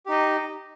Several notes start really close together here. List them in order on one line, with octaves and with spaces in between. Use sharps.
G4 D#4 D#5